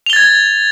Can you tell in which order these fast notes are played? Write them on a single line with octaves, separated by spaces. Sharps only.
F7 G7 A6 G#6